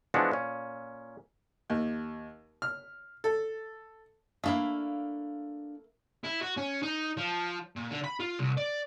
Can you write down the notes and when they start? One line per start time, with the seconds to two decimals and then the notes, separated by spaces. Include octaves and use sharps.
0.14 E3 F3 G#3 B3 D4 F#4
0.31 A#2 C#4
1.70 D#2
2.62 F6
3.24 A4
4.44 A3 A#3 D4 E4 F5
6.24 E4
6.42 F#4
6.57 C#4
6.83 D#4
7.17 F3
7.76 A#2
7.91 D3
8.04 B5
8.20 F4
8.39 C2
8.57 D5